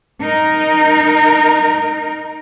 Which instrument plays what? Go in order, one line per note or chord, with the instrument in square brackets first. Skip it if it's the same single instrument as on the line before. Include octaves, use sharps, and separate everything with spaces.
[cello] D#4 A#4